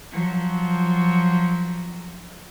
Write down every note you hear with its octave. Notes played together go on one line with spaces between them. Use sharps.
F3 F#3